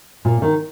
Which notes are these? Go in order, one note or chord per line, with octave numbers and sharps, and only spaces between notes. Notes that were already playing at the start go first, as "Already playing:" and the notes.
A#2
D#3